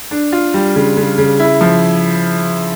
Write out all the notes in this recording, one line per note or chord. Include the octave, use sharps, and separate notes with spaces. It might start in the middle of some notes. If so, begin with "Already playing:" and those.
D4
F4
G3
C#3
C#3
C#3
E4
F3